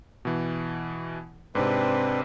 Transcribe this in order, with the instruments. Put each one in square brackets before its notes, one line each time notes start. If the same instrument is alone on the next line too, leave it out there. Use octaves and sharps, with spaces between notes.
[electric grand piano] B2 E3
[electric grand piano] G#2 C3 [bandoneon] C4 D4 B4